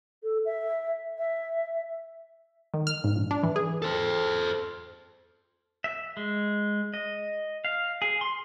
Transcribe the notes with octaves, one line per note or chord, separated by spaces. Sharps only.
A4
E5
E5
D#3
F6
G#2
A#1
D4
E3
G#4
A4 C5
E5
G#3
D#5
F5
G#4
C6